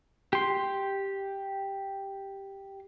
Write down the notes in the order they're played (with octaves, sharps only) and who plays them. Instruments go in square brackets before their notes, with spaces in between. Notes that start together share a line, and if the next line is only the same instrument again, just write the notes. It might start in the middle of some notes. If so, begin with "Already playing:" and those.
[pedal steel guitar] G4 C6